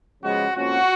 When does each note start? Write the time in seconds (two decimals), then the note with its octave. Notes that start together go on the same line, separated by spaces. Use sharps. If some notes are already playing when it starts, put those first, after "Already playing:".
0.21 C#3 F3 G#3 B3 F#4
0.55 F2 F3 A#3 C#4 F#4